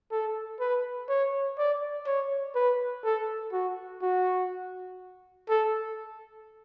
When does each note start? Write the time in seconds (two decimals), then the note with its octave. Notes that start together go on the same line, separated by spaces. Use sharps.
0.12 A4
0.60 B4
1.09 C#5
1.58 D5
2.06 C#5
2.55 B4
3.04 A4
3.53 F#4
4.02 F#4
5.49 A4